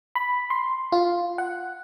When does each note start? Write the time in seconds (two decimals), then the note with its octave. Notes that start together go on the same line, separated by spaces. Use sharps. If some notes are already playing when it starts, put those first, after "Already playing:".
0.15 B5
0.50 C6
0.92 F4
1.38 F#5